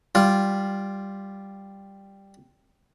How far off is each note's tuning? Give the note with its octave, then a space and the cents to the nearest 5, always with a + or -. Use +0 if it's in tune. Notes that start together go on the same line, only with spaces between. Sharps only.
G3 +0 F4 +0